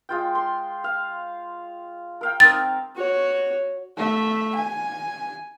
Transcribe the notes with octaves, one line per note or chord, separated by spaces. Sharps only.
G#3 F4 G5
C6
F5
A#4 F5 G5
C4 D#4 A#4 A6
F#4 C#5
A3 E5
G#5